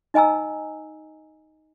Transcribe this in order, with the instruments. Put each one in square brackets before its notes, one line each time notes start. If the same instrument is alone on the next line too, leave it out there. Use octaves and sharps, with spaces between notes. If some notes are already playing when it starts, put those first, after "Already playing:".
[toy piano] D#4 D#5 G#5 A#5 E6